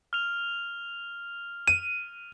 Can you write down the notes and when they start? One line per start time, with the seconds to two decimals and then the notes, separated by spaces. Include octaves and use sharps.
0.13 F6 F7
1.68 D#7